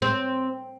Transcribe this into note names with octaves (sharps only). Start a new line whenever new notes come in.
C4